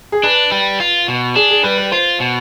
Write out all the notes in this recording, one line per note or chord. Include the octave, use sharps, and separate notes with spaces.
G#4
D4 B4
G3
F4
B2
D4 G#4
G#4
G3 B4
B4
F4 C5
B2